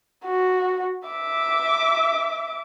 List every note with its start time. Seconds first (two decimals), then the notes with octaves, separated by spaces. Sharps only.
0.25 F#4
1.08 E5 D6